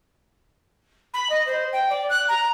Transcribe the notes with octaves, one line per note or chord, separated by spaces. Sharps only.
B5
D#5
C5
G5
D5
F#6
A#5